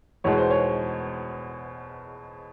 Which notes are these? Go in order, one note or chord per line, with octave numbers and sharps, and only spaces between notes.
E2 B2 G#3 C#5
C5
C#5